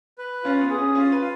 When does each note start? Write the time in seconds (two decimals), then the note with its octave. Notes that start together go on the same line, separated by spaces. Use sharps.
0.18 B4
0.44 C#4 F4
0.61 B3
0.70 G#4
0.78 C#4
0.95 C#4 F4
1.12 B4
1.21 F4